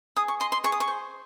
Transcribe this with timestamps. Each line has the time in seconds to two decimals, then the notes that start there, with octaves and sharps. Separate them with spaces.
0.16 G#4 D#6
0.28 C#6
0.40 D#5 C6
0.52 C6
0.64 G#4 C#6
0.72 D#6
0.80 C#6
0.88 C5